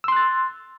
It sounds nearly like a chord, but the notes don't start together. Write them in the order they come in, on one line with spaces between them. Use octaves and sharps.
E6 C6 F#6 A6